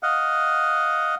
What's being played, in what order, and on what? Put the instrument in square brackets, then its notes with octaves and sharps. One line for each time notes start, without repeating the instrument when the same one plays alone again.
[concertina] D#5 F5 F#5